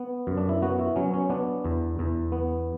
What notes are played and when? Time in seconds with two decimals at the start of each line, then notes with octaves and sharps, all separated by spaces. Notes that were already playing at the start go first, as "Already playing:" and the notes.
Already playing: B3
0.27 F#2
0.37 D4
0.49 E4
0.62 B3 F#4
0.79 E4
0.96 F#3 C#4
1.14 C#4
1.30 B3 D4
1.64 E2
1.99 E2
2.32 B3